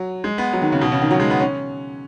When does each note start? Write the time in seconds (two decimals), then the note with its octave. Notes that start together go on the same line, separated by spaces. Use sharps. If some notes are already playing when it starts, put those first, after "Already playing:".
Already playing: F#3
0.24 G#3
0.38 B3
0.53 F#3
0.62 D#3
0.72 C#3
0.81 B2
0.92 C#3
1.01 D#3
1.11 F#3
1.20 G#3
1.30 B3
1.40 C#4